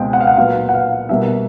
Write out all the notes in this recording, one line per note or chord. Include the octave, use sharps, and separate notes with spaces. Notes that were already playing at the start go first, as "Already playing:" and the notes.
Already playing: C#2 B2 G#3 C4 G5
F#5
F5
F#5
A#2 F#3 B3 F5
F#5
F5
B2 G3 A#3 E5